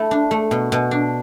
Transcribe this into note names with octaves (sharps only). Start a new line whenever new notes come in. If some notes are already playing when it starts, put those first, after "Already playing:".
Already playing: A3 E4 A5
D4
A3
B2
B2
D4